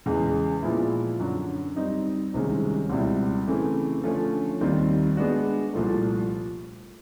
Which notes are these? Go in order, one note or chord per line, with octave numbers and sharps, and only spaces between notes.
E2 C#3 E3 G#3
A#2 F3 G#3 B3 E4
F#2 D3 F#3
G3 C4 D#4
C2 C3 D#3 G#3 C#4
C#2 B2 G3 C4 E4
C#3 E3 A3 C4
D3 F3 A3 C#4
D#2 D#3 G3 C4
G#3 B3 D4 F#4
C2 A#2 F3 A3